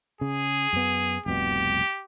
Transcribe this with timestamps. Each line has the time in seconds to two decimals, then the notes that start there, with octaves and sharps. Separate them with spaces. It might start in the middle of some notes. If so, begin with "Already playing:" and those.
0.21 C#3 G#4
0.73 F#2 B3
1.26 F1 C2 B2 G4